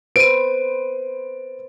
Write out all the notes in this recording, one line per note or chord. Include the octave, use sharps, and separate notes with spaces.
B4 C5 D7 D#7